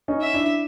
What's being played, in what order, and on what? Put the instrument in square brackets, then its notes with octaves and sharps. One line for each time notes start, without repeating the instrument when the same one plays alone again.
[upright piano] C#4 D#4
[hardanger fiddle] E5
[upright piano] D4 E4